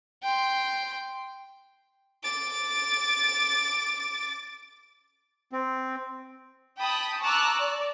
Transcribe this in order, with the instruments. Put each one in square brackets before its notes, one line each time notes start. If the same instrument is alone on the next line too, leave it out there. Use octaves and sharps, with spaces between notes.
[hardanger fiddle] G5 C6
[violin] D6 A6
[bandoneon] C4
[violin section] G5 A5 B5 D#6
A5 A#5 C#6 D6 E6 F#6
D5